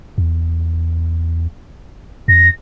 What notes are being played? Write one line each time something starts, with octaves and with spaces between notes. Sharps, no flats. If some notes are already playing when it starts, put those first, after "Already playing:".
E2
F2 A#6